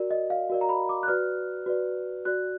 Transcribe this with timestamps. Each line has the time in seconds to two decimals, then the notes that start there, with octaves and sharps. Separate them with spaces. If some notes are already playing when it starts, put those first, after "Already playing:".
Already playing: F#4 A#4 D5
0.11 D#5
0.30 F5
0.50 F#4 A#4 D5
0.61 A#5
0.69 B5
0.89 D6
1.03 F#6
1.08 F#4 B4 D5 F6
1.66 F#4 B4 D5
2.25 F#4 D5 F#6